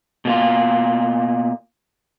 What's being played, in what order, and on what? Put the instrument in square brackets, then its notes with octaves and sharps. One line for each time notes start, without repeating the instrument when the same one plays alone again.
[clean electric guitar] B2 A#3 F4